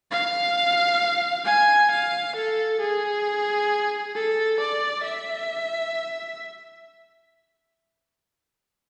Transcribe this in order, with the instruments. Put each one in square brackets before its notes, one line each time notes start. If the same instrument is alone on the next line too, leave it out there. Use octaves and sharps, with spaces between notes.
[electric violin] F5
G#5
F5
A4
G#4
A4
D5
E5